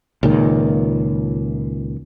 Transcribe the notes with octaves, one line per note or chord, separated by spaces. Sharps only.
C#2 A#2 D#3